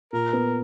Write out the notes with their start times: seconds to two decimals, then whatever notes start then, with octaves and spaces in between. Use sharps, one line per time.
0.13 A#2 A#4
0.33 B3